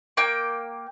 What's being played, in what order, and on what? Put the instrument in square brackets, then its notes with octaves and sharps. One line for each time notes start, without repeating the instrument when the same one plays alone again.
[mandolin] A#3 G5